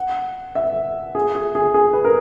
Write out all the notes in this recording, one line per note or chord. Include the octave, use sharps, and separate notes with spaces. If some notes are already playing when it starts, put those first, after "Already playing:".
Already playing: F#5
E5
G#4
G#4
G#4
G#4
B4
A#4